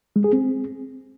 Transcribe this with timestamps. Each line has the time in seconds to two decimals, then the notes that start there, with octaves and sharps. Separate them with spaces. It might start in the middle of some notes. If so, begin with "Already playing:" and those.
0.16 G#3
0.24 G#4
0.33 C4